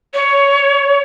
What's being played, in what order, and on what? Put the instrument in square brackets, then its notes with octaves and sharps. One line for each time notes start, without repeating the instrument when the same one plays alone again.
[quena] C#5